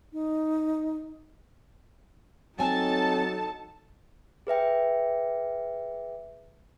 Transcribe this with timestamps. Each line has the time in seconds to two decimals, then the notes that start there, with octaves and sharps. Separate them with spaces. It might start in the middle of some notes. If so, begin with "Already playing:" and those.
0.13 D#4
2.59 F#3 C4 D#4 A4 C#5 G#5 A5
4.47 G#4 B4 E5 G5